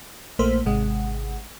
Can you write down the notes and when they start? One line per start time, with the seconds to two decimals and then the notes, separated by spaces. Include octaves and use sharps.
0.39 A#1 A3 A#3 C5 B6
0.65 G#1 C3 G#3 F#5